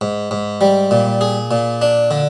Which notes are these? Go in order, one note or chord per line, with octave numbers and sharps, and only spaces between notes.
G#2
G#2
G3
A#2
G#4
A#2
D4
D3